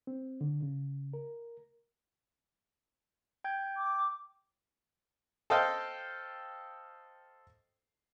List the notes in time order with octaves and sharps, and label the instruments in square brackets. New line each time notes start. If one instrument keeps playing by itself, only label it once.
[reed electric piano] C4
D3
C#3
A#4
[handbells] G5 G6 G#6
[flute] D6
[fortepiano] A4 C5 D#5 F5 G5